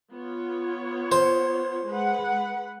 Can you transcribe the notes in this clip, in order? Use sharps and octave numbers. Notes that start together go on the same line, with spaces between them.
B3 F4 C#5
C5
G#3 B4 F#5